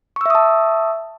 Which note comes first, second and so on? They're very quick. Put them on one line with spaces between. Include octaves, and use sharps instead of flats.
C#6 E6 E5 D#6 A5